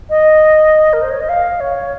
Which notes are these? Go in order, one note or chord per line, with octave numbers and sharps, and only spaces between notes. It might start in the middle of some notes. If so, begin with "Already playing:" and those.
D#5
A#4
C5
C#5
D#5
F5
C#5